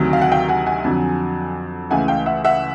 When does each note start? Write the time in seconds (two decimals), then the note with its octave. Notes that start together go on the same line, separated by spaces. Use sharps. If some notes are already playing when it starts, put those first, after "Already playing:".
Already playing: D2 C3 D#3 F#3 A3
0.13 F5
0.22 F#5
0.32 F5 G5
0.48 F#5 G#5
0.66 F#5 G#5
0.84 F2 D3 F#3
1.90 C#2 C#3 E3 A3 F#5 G#5
2.08 F5 G5
2.26 E5 F#5
2.45 E5 F#5